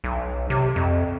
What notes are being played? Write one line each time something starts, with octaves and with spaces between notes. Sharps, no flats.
B1
C3
F2